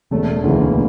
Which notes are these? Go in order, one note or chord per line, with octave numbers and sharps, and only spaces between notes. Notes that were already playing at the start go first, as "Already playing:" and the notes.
E1 A3
D2 C#3 E3 A#3